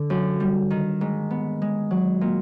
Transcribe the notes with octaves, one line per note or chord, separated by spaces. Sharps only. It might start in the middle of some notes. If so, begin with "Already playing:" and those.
Already playing: D3
F#2
G3
D#3
G#2
B3
G#3
F#3
A#2